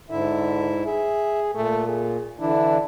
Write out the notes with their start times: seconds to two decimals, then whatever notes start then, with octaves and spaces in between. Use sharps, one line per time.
0.10 G#2 D3 E4 E5
0.85 G#4 E5
1.55 A#2 A3
1.88 G#4
2.40 D3 E3 D4 E4